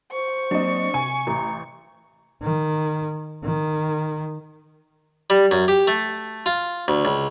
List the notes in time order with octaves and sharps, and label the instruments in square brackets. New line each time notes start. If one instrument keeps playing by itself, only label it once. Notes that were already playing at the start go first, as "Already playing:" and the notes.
[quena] C5 [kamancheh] C#6
[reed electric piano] F#3 A#3 C4 [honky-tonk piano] D4 D#5
[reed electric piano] C3 [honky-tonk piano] G#5
[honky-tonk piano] A1 [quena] A#5
[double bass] D#3
D#3
[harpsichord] G3
F#2
G4
A3
F4
D2
C#2